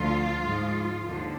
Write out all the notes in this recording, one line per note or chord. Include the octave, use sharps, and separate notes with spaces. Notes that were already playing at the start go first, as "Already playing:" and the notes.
Already playing: D2 D3 F3 F4
G#2 F3
D#2 D3 F3